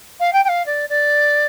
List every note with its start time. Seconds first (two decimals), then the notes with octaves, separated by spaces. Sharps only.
0.20 F5
0.33 G5
0.44 G5
0.48 F5
0.66 D5
0.89 D5